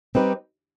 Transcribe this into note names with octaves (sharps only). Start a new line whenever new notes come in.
G3 C4 D#4 G4 B4